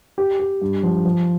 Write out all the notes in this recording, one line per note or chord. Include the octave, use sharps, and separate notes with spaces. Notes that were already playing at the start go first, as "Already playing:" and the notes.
G4
G4
G2
F3
F3